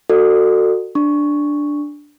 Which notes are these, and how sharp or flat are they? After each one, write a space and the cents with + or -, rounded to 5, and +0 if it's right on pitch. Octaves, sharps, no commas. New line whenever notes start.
F#4 +0 A4 +25 D5 +45
D4 +0 C#6 +0